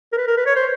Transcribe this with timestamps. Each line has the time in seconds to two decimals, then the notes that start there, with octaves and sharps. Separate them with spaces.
0.12 A#4
0.17 B4
0.27 A#4
0.37 B4
0.46 C#5
0.56 C5